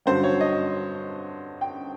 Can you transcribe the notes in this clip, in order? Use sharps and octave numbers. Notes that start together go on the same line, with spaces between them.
G2 D3 F#3 C5
C#5
D#5
G5